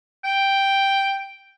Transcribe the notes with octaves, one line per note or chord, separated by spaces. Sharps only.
G5